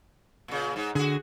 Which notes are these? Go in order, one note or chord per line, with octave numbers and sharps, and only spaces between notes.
A#2 C#3
G#2
D3 F#4 G#4